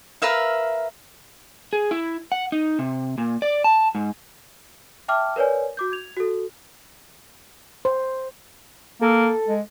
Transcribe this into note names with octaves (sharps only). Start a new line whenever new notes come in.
A#4 B4 E5 F5
G#4
E4
F#5
D#4
C3
A#2
D5
A5
G#2
E5 G5 A5 D6 F6
A#4 B4 C#5 D5 G#5
F#4 D6 G6
G#6 F7
F#4 A4
C5
A#3 A4
G#3